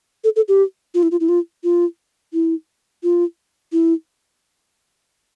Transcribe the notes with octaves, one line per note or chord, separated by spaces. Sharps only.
A4
A4
G4
F4
E4
F4
E4
F4
F4
E4
F4
E4